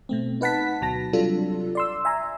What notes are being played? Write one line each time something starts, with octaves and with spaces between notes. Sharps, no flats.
B2 A3 C4
D#4 B4 F#5 A5 B6
D2 B2 F#3 A5 A#6
C3 F#3 G3 D4 F4 A4
D5 C6 E6
E5 G#5 A#5